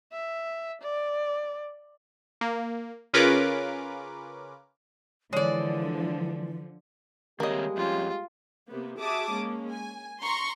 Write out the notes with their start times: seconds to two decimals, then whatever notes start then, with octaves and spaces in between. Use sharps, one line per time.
0.12 E5
0.82 D5
2.41 A#3
3.14 C#3 C#4 F4 A#4 B4 D6
5.33 D3 E3 F3 G#3 C#5 D5
7.40 D#3 G3 G#3 A#3 C4 G4 C#5 D#5
7.77 F2 C#4 F4
8.68 C3 A#3 B3
8.99 F#4 G#4 E5 A5 D6 D#6
9.31 G#3 A#3 C#4
9.70 G#5
10.21 A#5 C6 C#6